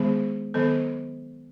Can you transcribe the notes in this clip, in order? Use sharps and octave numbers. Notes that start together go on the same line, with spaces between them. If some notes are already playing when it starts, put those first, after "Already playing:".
Already playing: D#3 G#3 B3 G#4
D#3 F#3 B3 A4